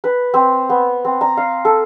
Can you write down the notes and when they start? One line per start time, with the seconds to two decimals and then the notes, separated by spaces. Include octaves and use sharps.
0.04 B4
0.34 C4
0.69 B3
1.05 C4
1.21 A#5
1.37 F5
1.65 A4